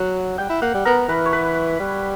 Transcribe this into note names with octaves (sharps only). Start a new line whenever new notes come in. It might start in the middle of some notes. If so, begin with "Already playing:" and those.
Already playing: F#3 F#5
G3 G5
E4
A#3 F#5
G3
B3 A#4
E3 B4
C#5
B4
G3